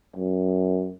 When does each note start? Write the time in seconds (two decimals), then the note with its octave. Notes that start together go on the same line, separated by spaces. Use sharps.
0.16 F#2